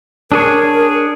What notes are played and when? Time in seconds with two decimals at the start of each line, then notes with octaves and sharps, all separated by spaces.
0.32 D4 G#4 A#4 C#5